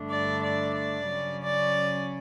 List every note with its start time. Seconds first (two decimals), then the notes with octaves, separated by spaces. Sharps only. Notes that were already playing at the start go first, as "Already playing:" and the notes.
Already playing: G2 D3 A3 D4
0.09 D5
0.42 D5
0.75 D5
1.09 C#3 F#3 C#4
1.42 D5